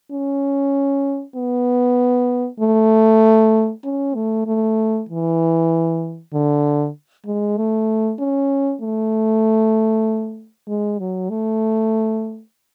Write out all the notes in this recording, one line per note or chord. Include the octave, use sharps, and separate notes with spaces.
C#4
B3
A3
C#4
A3
A3
E3
D3
G#3
A3
C#4
A3
G#3
F#3
A3